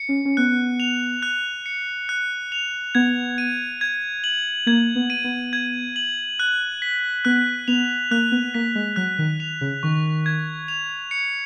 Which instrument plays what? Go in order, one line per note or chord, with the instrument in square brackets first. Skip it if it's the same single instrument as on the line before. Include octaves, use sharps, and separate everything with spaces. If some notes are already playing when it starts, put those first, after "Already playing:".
Already playing: [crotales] C#7
[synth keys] C#4
C#4
[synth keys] B3 [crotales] F#6
[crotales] F7
F#6
C#7
F#6
F7
[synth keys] B3 [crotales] G#6
[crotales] D#7
G#6
F#7
[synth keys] A#3 [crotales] G#6
[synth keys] B3
[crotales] D#7
[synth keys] B3
[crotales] G#6
F#7
F#6
B6
[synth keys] B3 [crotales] F#6
[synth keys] B3 [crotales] F7
[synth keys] A#3 [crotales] F#6
[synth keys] B3
[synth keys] A#3 [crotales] B6
[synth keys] G#3
[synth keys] F#3 [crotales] F#6
[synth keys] D#3
[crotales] F7
[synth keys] C#3
[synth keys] D#3 [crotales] C#6
[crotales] G#6
F7
C#7